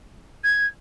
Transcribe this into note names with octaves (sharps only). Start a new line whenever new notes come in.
G#6